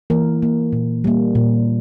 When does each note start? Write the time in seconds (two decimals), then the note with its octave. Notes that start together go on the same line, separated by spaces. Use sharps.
0.10 E3 A#3 A#4
0.42 A#3
0.73 A#2
1.04 G3 A#3
1.35 A#2